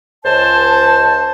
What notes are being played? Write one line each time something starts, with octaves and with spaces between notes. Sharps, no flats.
C#2 C5 A5